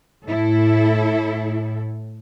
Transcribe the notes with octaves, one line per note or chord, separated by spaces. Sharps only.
A2 E4 A4